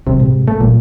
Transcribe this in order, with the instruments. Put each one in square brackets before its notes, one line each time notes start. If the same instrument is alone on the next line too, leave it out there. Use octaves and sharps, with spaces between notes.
[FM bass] C3 [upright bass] F#3
[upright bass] G#1 A2
[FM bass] A3
[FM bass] A#2 [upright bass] F#3